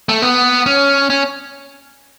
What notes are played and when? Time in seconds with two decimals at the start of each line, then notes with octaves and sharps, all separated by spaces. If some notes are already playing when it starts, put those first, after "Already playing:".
0.09 A3
0.22 B3
0.66 C#4
1.10 C#4